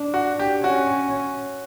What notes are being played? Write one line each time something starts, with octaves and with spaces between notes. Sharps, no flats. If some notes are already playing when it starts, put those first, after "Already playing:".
Already playing: D4
F#4
G4
C#4 F#4